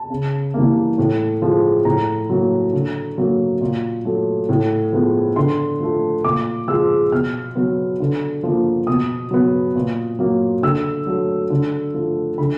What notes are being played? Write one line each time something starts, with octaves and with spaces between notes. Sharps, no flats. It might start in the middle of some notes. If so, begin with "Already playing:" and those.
Already playing: A5
C#3
E3 G3 A#3
A2
F3 G#3
A2 A#5
F#3 A#3
D3
F#3 A#3
A#2
F#3 A3
A2
F3 G#3 B3
D3 C6
F3 A3
A#2 D6
F3 G#3 E6
B2 F6
F#3 B3
D3
F3 A#3
B2 D#6
F#3 B3
A#2
F#3 A#3
D3 E6
F#3 A3
D3
F3 A3
D3 B5